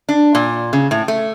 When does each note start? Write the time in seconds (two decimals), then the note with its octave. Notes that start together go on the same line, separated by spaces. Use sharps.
0.09 D4
0.35 A#2
0.73 C#3
0.91 A2
1.08 A3